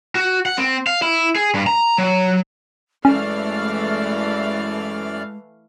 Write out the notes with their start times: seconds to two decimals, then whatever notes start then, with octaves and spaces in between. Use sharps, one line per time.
0.15 F#4
0.46 F#5
0.58 C4
0.87 F5
1.02 E4
1.36 G#4
1.54 G2
1.67 A#5
1.98 F#3
3.05 F#2 E3 G#3 A3 C#4 D5 F5 F6